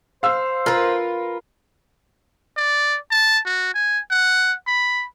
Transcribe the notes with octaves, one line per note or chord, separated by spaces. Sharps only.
C5 F5 E6
F4 A#4 B4
D5
A5
F#4
G#5
F#5
B5